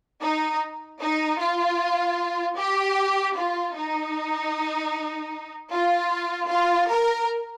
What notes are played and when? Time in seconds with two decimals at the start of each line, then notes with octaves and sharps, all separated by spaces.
0.22 D#4
1.01 D#4
1.39 F4
2.57 G4
3.36 F4
3.75 D#4
5.71 F4
6.49 F4
6.89 A#4